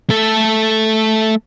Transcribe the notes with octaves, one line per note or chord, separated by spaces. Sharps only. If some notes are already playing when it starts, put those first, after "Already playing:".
A3 A4